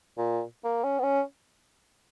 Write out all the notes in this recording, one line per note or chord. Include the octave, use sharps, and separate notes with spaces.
A#2
A#3
C#4
B3
C#4